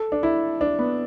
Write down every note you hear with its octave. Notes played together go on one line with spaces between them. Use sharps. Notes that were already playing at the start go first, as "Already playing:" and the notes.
Already playing: A4
D4
E4
D4
B3